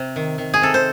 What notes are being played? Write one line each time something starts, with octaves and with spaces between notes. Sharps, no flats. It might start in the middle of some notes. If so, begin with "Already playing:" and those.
Already playing: C3
D#3
D#3
G#4
C3 A4
C5